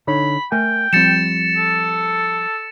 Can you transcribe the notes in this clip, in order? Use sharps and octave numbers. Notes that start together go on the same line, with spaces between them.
D3 D#4 C#5 B5
A3 A#4 G5 G#5
F3 G3 C4 A6 C#7 E7
A4